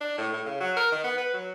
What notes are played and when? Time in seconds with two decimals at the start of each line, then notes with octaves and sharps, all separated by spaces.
0.01 D4
0.18 A2
0.33 A2
0.46 C#3
0.60 F#3
0.77 A#4
0.92 D#3
1.04 B3
1.18 B4
1.34 F#3